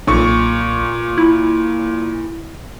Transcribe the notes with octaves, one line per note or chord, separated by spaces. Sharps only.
B1 A#2 C#6
E4